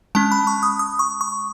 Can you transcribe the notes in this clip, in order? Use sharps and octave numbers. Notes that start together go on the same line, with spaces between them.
G#3 C#4 A5
B5
C#6
D#6
D#6
C#6
C#6